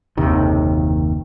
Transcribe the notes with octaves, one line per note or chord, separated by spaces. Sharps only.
F#1 D#2 C3 D#3